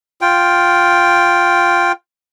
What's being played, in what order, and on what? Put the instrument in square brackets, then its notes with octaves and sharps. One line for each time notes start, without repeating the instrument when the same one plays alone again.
[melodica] F4 G5